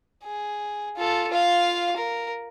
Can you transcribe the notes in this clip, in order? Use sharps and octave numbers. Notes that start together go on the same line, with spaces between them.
G#4
F4 A4
F4 F5
A#4